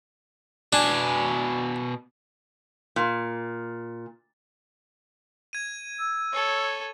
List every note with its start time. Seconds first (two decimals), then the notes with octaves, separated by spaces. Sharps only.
0.73 B2 D4 G#5
2.96 A#2
5.53 G#6 D#7
5.99 E6
6.33 A4 C#5